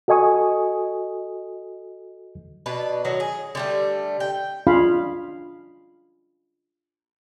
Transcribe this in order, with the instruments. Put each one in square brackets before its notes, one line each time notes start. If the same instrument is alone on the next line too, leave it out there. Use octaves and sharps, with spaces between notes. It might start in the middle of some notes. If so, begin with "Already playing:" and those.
[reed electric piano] F#4 A4 D#5 G#5 C#6 D#6
[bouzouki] B2 D4 B4
A2 D#3 F#3
G#4
D3 G3 A3
G5
[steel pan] D4 F4 G#4 F5 B5